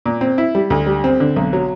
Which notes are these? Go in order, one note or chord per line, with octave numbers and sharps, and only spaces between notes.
A#2
C4
E4
G3
D2
G3
C4
D3
B1
F#3